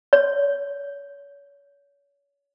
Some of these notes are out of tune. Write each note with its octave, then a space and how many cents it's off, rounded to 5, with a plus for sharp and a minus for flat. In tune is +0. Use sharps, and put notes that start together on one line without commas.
C#5 +35